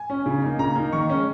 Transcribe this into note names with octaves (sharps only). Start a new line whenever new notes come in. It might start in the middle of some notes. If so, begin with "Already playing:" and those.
Already playing: G#5
C#4
C#3
A#3 D#4
C#3 A#5
A#3 D#4
D#3 C#6
G#3 C#4